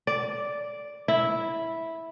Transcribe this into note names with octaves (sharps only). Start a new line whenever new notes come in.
D5
E4